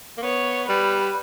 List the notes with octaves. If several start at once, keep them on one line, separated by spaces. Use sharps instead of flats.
A#3
B3 C#5
G3 B4